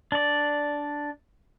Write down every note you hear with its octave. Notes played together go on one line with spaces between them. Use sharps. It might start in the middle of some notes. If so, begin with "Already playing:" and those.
D4 D5